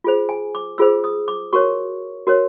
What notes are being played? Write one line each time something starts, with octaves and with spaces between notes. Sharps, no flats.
F4 G#4 C5
G#5
D6
F4 G#4 C5 E6
D#6
D6
F#4 A#4 C#5 C#6
F#4 A#4 C#5